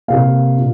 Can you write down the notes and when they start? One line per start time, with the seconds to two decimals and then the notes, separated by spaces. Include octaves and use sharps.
0.08 C3 A#3 F5
0.58 A#2